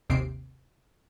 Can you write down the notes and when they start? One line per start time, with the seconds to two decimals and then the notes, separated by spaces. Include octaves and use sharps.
0.10 G#1 D#2 C3 C7 D7